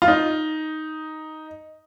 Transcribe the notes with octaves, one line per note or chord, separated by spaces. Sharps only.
F4
D#4